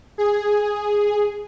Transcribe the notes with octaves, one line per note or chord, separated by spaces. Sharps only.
G#4